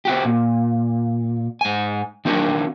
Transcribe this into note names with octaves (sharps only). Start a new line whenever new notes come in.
C4 F#4 G4
A#2
G#2 G#5
D#3 C4 D4 F#4 A#4